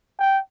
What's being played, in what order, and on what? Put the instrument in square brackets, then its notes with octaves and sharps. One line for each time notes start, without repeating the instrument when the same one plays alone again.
[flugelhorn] G5